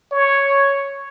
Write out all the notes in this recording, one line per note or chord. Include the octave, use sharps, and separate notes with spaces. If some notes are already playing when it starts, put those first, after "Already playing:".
C#5